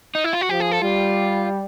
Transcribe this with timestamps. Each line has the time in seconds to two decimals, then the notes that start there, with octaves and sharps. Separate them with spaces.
0.15 D#4
0.24 E4
0.33 F4
0.41 F#4
0.49 F3 G4
0.60 G#4
0.71 A4
0.82 G3 F4